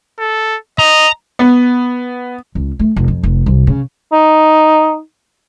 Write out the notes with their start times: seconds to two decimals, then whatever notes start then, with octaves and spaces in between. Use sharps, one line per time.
0.19 A4
0.79 D#5 A#5
1.39 B3
2.55 C#2
2.79 A3
2.96 F1
3.08 F2
3.23 F1
3.46 C2
3.67 C#3
4.12 D#4